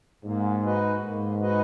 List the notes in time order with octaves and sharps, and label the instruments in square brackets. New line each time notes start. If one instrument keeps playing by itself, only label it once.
[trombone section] G#2 [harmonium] A#3
[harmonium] D#4 F#4 B4 D#5
[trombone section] G#2 [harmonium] A#3
[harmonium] D#4 F#4 B4 D#5